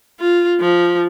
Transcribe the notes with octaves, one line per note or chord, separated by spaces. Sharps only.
F4
F3